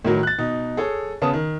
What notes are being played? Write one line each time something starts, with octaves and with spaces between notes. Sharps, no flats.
A2 D#3 F#3
F#6 A6
B2 D#4
G#4 A4 C#5
C#3 B3 C#4 A5 D#6
D#3